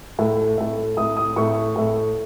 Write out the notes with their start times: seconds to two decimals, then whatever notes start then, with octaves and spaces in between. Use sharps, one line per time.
0.19 A2 A3
0.58 A2 A3
0.97 A2 A3 D#6
1.17 D#6
1.36 A2 A3 C#6
1.76 A2 A3